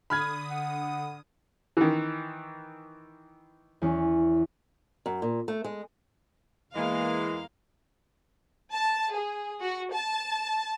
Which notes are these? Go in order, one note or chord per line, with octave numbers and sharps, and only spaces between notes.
D3 B5 D#6 F6 G#6
F#5
D#3 E3
E2 C#4
F#2
A#2
A3
G#3
E2 E3 G#3 A#3 F5
A5
G#4
F#4
A5